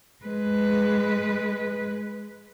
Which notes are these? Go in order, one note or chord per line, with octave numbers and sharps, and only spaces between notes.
G#3 B4